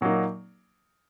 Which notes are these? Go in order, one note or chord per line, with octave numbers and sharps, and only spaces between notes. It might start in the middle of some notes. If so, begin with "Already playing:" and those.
A#2 F#3 A#3 D#4